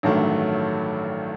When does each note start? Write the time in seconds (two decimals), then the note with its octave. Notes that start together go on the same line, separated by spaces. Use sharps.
0.03 A1 G2 D#3 F#3 A3